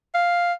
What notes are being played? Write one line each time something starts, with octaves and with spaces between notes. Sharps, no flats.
F5